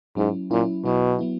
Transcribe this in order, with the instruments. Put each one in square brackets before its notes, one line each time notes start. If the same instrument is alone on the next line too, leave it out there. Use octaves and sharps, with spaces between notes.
[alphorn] G#2 [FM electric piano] F#3 C#4 E4
[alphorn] A#2 [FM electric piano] F#3 C#4 E4
[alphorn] B2 [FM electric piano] F#3 B3 E4
[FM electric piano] F#3 B3 E4